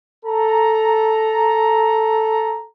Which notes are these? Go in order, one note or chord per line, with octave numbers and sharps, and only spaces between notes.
A4 A#5